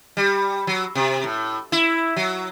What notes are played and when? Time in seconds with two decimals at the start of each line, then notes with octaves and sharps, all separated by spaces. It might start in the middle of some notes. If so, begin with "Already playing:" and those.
0.17 G3
0.67 F#3
0.95 C3
1.24 A2
1.72 E4
2.16 F#3